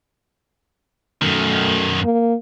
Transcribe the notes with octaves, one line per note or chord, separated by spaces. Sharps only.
F#2 D#3 A3
A#3